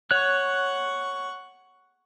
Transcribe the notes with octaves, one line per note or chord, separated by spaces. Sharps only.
C#5 F#5 C#6 F#6